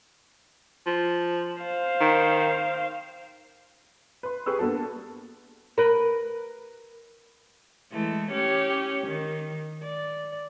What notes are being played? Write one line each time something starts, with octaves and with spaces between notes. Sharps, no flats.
F3
C5 F5
D#3
B4 C6
G4 G#4 B4 C#6 E6
A#3 B3 D4 F#4 A4
A#4 B4
E3 G#3 A3
C#4 G4 C#5
D#3
D5